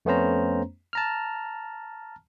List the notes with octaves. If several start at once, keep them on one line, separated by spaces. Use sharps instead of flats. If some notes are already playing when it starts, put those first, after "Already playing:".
F2 A3 B3 C#4 C5 A#5
A5 A#5 F6